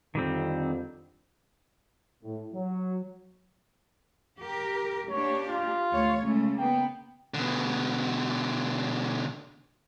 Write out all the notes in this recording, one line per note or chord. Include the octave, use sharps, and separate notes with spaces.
F2 D3 D#3 G3 C4
A2
F#3
G4 A#4
A#3 D4 G4 C#5
F4
D2 A3 C#5
C#3 G#3 A3
A#3 B3 G5
B2 D3